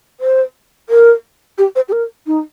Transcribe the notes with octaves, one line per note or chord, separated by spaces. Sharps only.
C5
A#4
G4
C5
G4
A#4
D#4